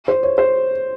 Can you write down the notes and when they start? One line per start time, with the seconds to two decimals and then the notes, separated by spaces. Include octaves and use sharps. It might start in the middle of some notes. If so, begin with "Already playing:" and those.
0.08 C5
0.23 C#5
0.38 C5